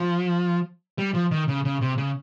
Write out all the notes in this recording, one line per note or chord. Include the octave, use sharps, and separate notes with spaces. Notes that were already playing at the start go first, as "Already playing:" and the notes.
Already playing: F3
G3
F3
D#3
C#3
C#3
C3
C#3